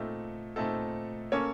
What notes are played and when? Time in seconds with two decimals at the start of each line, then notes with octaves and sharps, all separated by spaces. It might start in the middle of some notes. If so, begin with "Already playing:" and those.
Already playing: A#2 A3 C4 D#4 A4
0.56 A#2 A3 C4 D#4 A4
1.32 A#3 C#4 A4 C#5